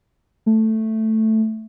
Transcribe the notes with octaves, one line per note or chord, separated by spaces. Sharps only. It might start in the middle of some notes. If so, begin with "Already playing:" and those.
A3